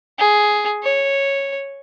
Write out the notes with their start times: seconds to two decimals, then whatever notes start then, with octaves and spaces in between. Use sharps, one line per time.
0.18 G#4
0.83 C#5